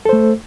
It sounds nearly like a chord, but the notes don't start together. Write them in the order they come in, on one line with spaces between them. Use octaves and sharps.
A4 C5 A3